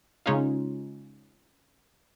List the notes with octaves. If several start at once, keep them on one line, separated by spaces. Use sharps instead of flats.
C#3 G#3 C#4 D#4 F4